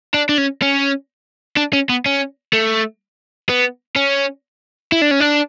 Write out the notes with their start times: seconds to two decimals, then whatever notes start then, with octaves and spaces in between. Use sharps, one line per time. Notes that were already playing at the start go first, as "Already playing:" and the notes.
0.14 D4
0.29 D4
0.38 C#4
0.62 C#4
1.57 D4
1.73 C#4
1.89 B3
2.06 C#4
2.53 A3
3.49 B3
3.96 C#4
4.92 E4
5.02 D4
5.11 C#4
5.20 D4